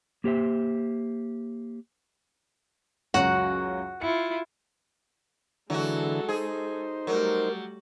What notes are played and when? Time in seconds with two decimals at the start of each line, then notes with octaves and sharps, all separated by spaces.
0.24 A#3 G4 C5 E5
3.14 C#2 F#2 F#3 F#4 F#5
4.02 E4 F4 C#7
5.70 D3 E3 F#3 G#3 F#4 A4
6.29 D#4 G#4 C5
7.07 F#3 G3 A3 A#4